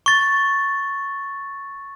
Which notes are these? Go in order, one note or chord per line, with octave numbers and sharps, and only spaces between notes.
C#6 A6